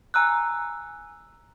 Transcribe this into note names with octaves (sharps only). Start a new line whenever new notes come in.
G#5 A#5 E6 F#6